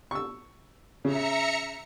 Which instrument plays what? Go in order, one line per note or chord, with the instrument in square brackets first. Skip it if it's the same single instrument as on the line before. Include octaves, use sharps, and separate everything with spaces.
[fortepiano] C#6 E6
[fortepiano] C#3 [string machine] E5 A#5 C#7